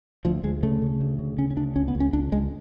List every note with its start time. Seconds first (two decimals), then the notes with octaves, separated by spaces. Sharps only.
0.25 D2 F3
0.44 D2 G#3
0.63 C#3 A3
0.82 C#3
1.01 D2
1.19 C#3
1.38 C#3 C#4
1.51 C#4
1.57 D2 D4
1.76 C#2 C#4
1.88 B3
1.95 C#2
2.00 C#4
2.13 C#2 D4
2.32 C#2 G#3